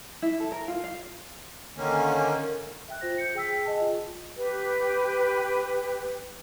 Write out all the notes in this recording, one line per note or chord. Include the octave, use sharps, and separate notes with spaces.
E4
A4
A#4
F4
F5
D3 D#3 A#3 C#4
E5 G5 F#6
F4 C5 A#6
G6 C#7
G#4 G5 E6 B6
G#4 D#5 G#5 A5
F4
G4 B4